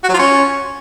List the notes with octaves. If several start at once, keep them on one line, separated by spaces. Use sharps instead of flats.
F#4
F#3
F4
C#4